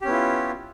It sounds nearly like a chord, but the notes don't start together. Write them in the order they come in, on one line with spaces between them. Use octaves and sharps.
G4 C#4 B3 E4 F4